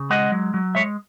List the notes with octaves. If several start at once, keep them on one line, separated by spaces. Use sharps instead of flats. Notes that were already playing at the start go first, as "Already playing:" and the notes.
Already playing: C#3
G#3 D#5 F#5
F#3
F#3
G#3 C#5 E5